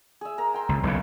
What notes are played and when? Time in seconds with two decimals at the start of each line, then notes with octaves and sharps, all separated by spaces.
0.21 G#4 E5
0.38 A#4 A#5
0.54 G5 C6
0.69 C#2
0.83 B1 C#3 A#3